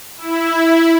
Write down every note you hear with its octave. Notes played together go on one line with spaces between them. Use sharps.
E4